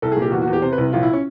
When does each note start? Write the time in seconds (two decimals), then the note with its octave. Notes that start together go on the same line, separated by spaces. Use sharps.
0.02 C2 A4
0.12 A#2 G#4
0.22 G4
0.32 E2 F#4
0.42 F#4
0.48 E2
0.53 G4
0.62 C3 C5
0.73 B4
0.78 C2
0.92 A#1 F4
1.03 E4
1.13 C#4